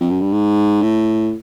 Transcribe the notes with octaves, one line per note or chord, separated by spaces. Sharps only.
F2
F#2
G2
G#2
A2